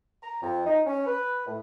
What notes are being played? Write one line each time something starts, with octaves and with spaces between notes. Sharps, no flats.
A#5
F2
D#4
C#4
B4
A2